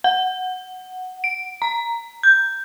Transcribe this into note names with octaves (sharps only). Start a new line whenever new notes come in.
F#5
D7
A#5
G6